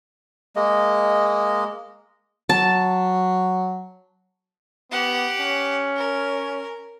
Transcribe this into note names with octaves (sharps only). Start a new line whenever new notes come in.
G#3 A#3 D#5
F#3 A5
B3 G4 F#5
C#4
A#4